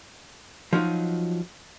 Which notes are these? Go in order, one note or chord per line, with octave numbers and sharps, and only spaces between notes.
F3 F#3 D#4